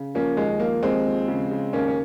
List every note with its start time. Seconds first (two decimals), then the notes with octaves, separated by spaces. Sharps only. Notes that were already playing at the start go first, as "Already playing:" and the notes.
Already playing: C#3
0.15 F3 A#3 C#4
0.37 D#2 G#3
0.60 F3 A#3
0.83 D#2 G#3 C4
1.06 F3
1.28 C#3
1.51 C#3
1.73 D#2 A#3 C#4
1.88 C#4